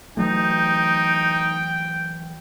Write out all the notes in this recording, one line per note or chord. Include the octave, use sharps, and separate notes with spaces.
E3 F#3 A3 D#4 G5